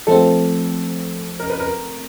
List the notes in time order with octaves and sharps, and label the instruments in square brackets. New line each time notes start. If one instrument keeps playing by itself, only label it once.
[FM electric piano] F3 A3 C4 [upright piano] A4
[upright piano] A#4
B4
A#4